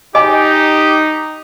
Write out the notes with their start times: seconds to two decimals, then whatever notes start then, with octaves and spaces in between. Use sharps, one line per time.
0.15 D#4 G4 D#5 G#5 D6